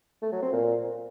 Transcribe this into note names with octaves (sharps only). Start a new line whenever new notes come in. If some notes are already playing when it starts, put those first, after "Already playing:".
A3
F#3
C4
A#2